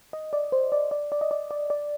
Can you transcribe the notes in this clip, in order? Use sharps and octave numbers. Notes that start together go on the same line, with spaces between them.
D#5
D5
C5
D5
D5
D5
D#5
D5
D5
D5